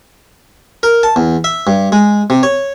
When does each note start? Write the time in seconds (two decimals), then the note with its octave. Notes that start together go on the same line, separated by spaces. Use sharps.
0.83 A#4
1.03 A5
1.16 E2
1.44 E5
1.67 G2
1.92 G#3
2.30 C3
2.43 C#5